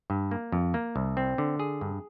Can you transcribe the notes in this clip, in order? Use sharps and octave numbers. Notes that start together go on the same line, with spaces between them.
G2
A#3
F2
A#3
C2
C4
D3
G#4
G2